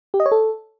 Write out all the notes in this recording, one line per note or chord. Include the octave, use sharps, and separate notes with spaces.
G4
D#5
C#5
A4